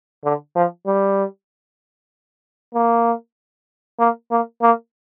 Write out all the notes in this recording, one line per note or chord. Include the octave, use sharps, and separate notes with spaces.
D3
F3
G3
A#3
A#3
A#3
A#3